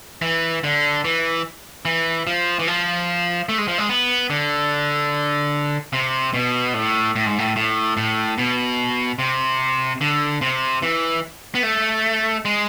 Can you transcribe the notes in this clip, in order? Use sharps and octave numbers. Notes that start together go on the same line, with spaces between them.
E3
D3
E3
E3
F3
E3
F3
A3
G#3
F3
G#3
B3
D3
C3
B2
A2
A2
G#2
A2
A2
A2
B2
C3
D3
C3
E3
B3
A3
G#3